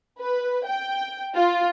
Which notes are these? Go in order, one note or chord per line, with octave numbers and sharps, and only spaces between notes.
B4
G5
F4